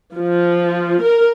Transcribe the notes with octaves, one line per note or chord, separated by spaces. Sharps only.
F3
A#4